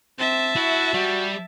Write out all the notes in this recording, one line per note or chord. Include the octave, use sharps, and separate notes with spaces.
C4 E5 A5
E4 F#4
G3 F#4